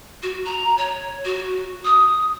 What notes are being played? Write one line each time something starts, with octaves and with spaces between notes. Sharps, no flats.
F#4
A#5
C#5
F#4
D#6